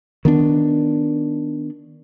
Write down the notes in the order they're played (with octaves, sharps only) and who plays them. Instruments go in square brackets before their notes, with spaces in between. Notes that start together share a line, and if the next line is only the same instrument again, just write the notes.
[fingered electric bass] D#3 B3 D4